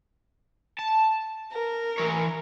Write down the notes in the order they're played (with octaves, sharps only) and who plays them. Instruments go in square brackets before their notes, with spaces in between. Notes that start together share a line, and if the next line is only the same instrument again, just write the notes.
[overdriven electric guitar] A5
[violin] A#4
[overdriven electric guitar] E3 C#5